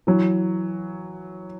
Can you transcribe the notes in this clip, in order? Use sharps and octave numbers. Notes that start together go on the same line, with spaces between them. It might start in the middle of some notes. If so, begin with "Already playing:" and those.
E3 F#3